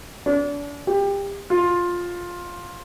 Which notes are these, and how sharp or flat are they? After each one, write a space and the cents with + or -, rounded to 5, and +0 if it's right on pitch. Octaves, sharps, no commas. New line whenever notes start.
D4 -35
G4 +25
F4 +10